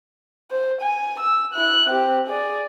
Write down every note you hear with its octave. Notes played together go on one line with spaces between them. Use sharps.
C5
G#5
E6
E4 F#6
C4 G4
G#4 D5